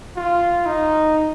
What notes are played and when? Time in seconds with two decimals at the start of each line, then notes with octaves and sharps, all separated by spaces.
0.17 F4
0.66 D#4